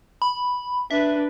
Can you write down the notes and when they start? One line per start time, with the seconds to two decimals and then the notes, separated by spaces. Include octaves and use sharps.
0.22 B5
0.91 D4 B4 E5